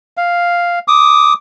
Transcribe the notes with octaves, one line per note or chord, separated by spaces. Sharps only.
F5
D6 D#6